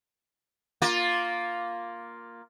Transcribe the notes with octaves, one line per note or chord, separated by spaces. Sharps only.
A#3 F4